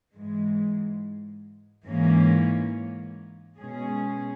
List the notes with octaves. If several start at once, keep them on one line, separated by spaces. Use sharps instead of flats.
G#2 E3 G#3
G#2 E3 A#3 C#4
B2 G#3 C#4 G#4